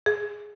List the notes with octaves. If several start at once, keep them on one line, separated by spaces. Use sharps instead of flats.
G#4